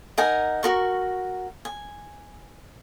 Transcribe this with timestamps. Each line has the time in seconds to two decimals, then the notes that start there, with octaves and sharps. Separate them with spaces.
0.18 D#4 A#4 F#5 G#5
0.63 F#4 A#4 C#6
1.65 G#5